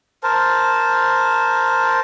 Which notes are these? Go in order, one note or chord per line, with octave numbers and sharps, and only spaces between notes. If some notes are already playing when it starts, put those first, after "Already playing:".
A#4 C5 A5